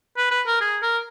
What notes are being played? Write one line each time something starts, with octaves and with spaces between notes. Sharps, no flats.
B4
B4
A#4
G#4
A#4